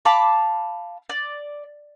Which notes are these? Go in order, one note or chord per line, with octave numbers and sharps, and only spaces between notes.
F5 A5 B5 D6
D5